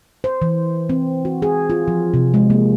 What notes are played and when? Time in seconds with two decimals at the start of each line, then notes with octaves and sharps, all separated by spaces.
0.24 C5
0.42 E3
0.90 C4
1.25 F#4
1.42 G#4
1.70 F4
1.88 F3
2.14 C3
2.34 G#3
2.50 A#3